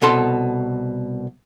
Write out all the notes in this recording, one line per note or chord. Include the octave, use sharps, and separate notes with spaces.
C2 B2 A4 C6